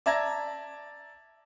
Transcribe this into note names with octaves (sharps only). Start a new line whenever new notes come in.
D5 E5 A5 A#5 G#6 A#6